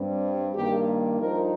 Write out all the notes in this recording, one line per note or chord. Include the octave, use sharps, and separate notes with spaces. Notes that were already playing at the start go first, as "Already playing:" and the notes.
Already playing: G2 G3 C4
G2 D#3 A#3 G4
G2 F3 D#4 A#4